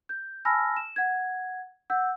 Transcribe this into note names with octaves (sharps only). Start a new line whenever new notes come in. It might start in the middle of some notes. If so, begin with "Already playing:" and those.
G6
G#5 A5 B5 E6 F6 A#6
E7
F#5 G#6
F#5 E6 G6